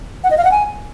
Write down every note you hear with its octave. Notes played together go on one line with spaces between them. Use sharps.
F#5
D#5
F5
F#5
G#5